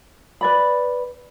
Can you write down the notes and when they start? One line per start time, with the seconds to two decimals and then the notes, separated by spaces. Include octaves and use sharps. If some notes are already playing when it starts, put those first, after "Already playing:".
0.41 B4 D5 B5